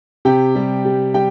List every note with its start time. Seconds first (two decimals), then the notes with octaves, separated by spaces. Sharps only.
0.25 C3 G4 G5
0.55 G3
0.85 G3
1.14 G3 G4 G5